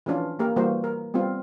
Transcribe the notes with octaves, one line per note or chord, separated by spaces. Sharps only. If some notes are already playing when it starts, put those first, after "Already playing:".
E3 F3 C#4 D4 F4
A#3 G4 A#4
E3 G3 A#3 F#4 C5
A#4
G3 B3 C4 F4